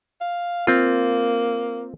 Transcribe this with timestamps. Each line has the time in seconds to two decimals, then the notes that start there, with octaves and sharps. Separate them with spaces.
0.21 F5
0.67 A#3 C4 F4